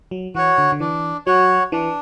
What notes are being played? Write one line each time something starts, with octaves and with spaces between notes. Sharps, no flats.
F#3
E3 F#4 C#5
D3
D3
E3 D4
F#3 F#4 C#5
E3 D4